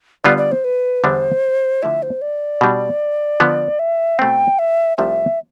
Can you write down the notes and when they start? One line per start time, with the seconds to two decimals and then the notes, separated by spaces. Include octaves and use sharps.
0.24 D3 G3 B3 F4 D5
0.38 D5
0.52 C5
0.64 B4
1.04 E2 D3 G3 B3 D4 C5
1.83 D3 F3 A3 E4 E5
2.03 C5
2.22 D5
2.61 B2 G3 D4
3.40 D3 F3 B3
3.79 E5
4.19 B2 A3 C4 G5
4.59 E5
4.97 C2 C3 F3 A3 E5